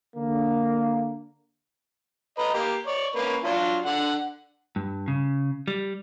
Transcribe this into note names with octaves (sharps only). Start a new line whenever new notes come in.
D3 A#3
B4 D#5 A#5
A#3 G4 A#4
C#5 D5
A#3 C#4 B4
F#3 D4 F4
D3 F#5
G2
C#3
G3